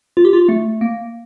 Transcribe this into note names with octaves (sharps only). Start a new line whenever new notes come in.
F4
G4
F4
A3
A#3